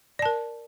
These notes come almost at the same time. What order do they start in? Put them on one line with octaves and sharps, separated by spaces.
D5 A5 A#4